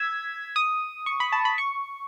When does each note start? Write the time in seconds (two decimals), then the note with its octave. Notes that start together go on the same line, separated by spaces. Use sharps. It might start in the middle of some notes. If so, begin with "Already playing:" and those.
Already playing: E6 G#6 B6
0.56 D#6
1.06 C#6
1.20 B5
1.32 A5
1.45 B5
1.58 C#6